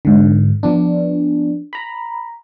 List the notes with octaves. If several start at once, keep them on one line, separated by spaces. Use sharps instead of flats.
G#2 D3
F3 B3 D4
A#5 B5